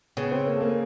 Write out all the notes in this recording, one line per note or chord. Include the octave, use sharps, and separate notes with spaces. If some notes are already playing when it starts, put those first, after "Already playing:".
C#3 B3
C4
A#3
A3
A#3